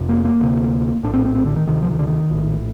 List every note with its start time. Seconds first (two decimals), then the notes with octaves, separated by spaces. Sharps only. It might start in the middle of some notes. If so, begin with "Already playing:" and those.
Already playing: F1 F2 C3
0.09 A#3
0.25 A#3
0.40 D2 C3
1.03 A#1 A2 D4
1.14 C4
1.25 C4
1.35 C4
1.45 D3
1.56 D#3
1.67 D2 C3 D#3
1.82 F3
1.91 D#3
1.99 D3
2.07 D#3
2.30 A#1 A2